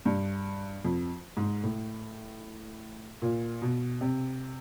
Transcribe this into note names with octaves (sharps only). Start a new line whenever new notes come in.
G2
F2
G#2
A2
A#2
B2
C3